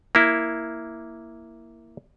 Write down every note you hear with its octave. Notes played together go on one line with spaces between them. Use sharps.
A#3 E4